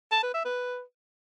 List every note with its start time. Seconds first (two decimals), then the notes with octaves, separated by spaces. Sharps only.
0.12 A5
0.23 B4
0.34 E5
0.45 B4